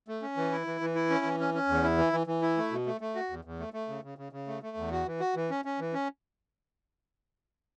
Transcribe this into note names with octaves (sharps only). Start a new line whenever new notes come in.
A3
C#4
E3
E4
E3
E3
E4
C#4
E3
C#4
C#4
E2
E4
E3
E3
E3
E4
A3
B2
A3
A3
F#4
E2
E2
A3
A3
C#3
C#3
C#3
C#3
A3
A3
E2
F#4
E3
F#4
E3
C#4
C#4
E3
C#4